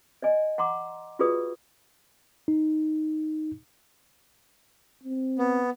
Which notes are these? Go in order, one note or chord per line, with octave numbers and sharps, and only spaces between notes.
D5 D#5 G#5
F#5 A#5 C6 D6
F4 F#4 G#4 B4 D5 D#6
D#4
C4
B3